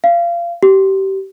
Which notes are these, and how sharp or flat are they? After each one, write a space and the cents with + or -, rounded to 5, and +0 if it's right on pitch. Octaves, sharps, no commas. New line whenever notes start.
F5 -25
G4 -25